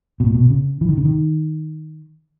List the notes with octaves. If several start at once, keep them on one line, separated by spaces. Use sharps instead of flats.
B2
A#2
B2
C#3
E3
D#3
C#3
D#3